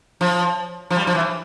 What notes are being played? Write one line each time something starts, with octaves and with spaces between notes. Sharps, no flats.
F3
F3
G3
F3
E3